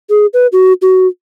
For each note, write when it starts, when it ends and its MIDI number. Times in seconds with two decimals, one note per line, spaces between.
0.10 0.26 68
0.34 0.47 71
0.52 0.73 66
0.82 1.07 66